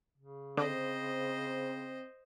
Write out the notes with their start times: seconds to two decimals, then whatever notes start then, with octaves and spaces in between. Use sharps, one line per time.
0.18 C#3
0.57 D3 C4 C5 D#5